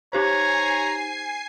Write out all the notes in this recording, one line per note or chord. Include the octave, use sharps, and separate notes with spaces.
D#4 G4 C5 C#5 G#5 A#5 C7